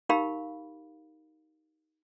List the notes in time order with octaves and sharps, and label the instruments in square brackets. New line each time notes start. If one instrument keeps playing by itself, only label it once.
[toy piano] D#4 G4 A#4 F5 B5